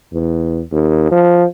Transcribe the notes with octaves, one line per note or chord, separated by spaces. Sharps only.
E2
D#2
F3